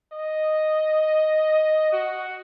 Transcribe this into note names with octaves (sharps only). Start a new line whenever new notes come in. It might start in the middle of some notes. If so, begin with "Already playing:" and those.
D#5
F#4